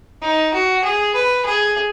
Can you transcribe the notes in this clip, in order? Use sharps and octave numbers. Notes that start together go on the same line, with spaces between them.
D#4
F#4
G#4
B4
G#4